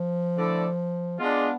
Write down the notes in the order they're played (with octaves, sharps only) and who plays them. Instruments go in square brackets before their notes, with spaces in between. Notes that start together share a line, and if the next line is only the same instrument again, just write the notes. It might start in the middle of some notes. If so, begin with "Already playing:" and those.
Already playing: [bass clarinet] F3
[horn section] D3 A3 E4 A4 D5
[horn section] G#3 D4 F4 [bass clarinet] B3